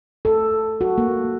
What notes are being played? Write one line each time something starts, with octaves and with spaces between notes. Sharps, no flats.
A4
F#4
A#3